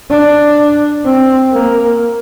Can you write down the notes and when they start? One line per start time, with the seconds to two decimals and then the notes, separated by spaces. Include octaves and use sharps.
0.10 D4
1.05 C4
1.53 A#3